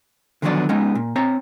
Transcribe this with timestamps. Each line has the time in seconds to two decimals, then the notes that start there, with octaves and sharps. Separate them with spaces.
0.42 D3 D#3 F3 F#3 B3 D5
0.69 G#3 B3 C#4 D#4
0.95 A#2
1.16 C4 C#5 A#5